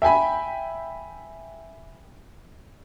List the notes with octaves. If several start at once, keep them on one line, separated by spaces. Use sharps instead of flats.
E5 G5 G#5 B5